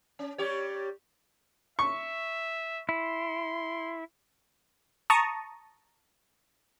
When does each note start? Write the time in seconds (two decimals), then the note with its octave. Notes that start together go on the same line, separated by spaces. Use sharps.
0.19 C#4
0.38 G3 G4 C#5
1.79 E5 C#6
2.89 E4 C6
5.10 A5 A#5 C#6 D#6